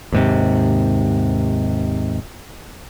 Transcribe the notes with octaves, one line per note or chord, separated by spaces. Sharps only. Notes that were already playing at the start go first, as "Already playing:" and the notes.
D#2 G#2 C3